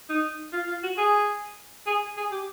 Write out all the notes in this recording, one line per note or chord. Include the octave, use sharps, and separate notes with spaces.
D#4
F4
F4
F#4
G#4
G#4
G#4
G4